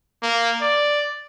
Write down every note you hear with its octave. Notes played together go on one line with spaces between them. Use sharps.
A#3
D5